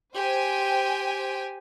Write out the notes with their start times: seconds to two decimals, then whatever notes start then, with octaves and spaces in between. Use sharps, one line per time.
0.15 G4 C5 G5 G#5